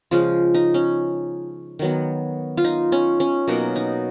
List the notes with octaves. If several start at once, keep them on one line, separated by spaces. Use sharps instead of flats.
C#3 F3 G#3 F4
D#4
C#4
D#3 F#3 B3
F4
D#4
C#4
C#4
B2 F#3 A#3 D#4
D#4